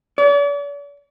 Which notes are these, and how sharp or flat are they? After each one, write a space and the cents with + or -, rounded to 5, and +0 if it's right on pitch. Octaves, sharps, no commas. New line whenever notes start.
D5 -45